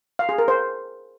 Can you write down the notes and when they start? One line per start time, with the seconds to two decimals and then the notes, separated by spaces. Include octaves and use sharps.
0.19 F5
0.29 G#4
0.38 A#4
0.48 C5